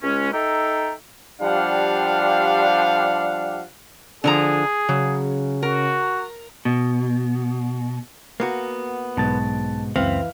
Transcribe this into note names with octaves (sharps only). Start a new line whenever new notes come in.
C#2 G#3 C#4
D#4 A4 E5 G5 A#5
F3 G3 D4 G4 F5 F#5
D3 F3 G#4 A#5
C#3 F#3
F#4 A#4
B2
A#3 B3 F#4
B1 G#2 B2 A5 A6
C#2 F#2 E3 C4 B4 F5